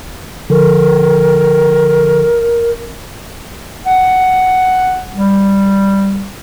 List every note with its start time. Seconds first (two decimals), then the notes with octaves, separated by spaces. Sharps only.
0.50 D3 F3 A4 A#4
3.86 F#5
5.11 G3